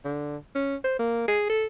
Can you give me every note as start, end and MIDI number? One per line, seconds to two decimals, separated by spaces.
0.05 0.37 50
0.55 0.76 61
0.84 0.95 72
0.99 1.25 58
1.28 1.47 68
1.50 1.66 69